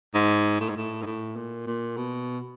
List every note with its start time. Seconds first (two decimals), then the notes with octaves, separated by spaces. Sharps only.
0.14 G#2
0.61 A2
0.69 G#2
0.77 A2
1.02 G#2
1.06 A2
1.36 A#2
1.67 A#2
1.97 B2